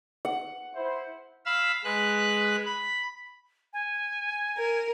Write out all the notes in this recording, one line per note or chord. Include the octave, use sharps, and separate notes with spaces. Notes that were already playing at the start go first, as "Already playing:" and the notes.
F#5
E4 C5
F5 B5 E6
G#3 B4 F#6
B5
G#5
A#4